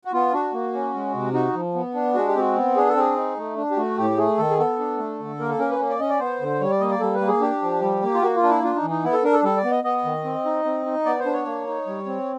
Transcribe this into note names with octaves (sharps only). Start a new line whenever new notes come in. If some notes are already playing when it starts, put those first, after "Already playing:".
F#4
B3 F4
D4 F#4
A#3
C#4
G#3
C3
D#4 F#4
F3
B3
D4
G#3 F#4
G4
C4 F#4
B3
D4 G#4
A4
C4 G#4
D#4
A3
D4
G4
A3 F#4
A2 G4
A3 G#4
D#3 A4
G#4
B3 A4
D4
A3
D3
A#3 A#4
A4
C#4 A#4
B4
A#3
D5
C#4 D#5
D5
B3 C5
D3
G3 C#5
D5
A#3 D#5
D5
G3 A4
B4
A#3
G#4
D4 G4
F3
G3
A#3
F4
A#3 F#4
F4
D4
E4
D4 F4
D#4
E3
D#4
B3 E4
A4
D4 A#4
A4
G3 A4
D5
B3
D#5
B3 D#5
D#3
C4
D#4
C4
D#4
B3 D5
C5
D4
C#5
A#3
D#4
G3
C4